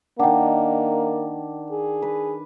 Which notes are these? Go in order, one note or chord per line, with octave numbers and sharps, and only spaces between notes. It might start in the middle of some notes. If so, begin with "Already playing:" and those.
D#3 A#3 D4 F#5 G5
G#4
B4